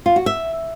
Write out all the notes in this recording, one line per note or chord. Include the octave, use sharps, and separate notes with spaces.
F4
F#4
E5